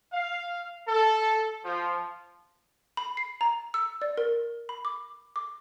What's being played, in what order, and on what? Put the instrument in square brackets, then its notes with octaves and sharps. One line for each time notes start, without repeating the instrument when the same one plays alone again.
[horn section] F5
A4
F3
[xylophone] B5
C7
A#5
E6
D5
A#4
B5
D6
D6